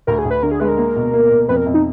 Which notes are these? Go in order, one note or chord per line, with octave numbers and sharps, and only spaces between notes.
D2 A#4
G#4
D2
B4
D3 A#4
G#4
G#3 B4
A#4
A#3
B2
A#3
B2
F2 B4
A#4
F2
D#4